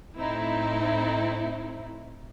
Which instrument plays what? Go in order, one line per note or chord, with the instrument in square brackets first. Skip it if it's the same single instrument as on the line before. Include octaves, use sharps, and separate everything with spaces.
[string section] A2 C4 D#4 E4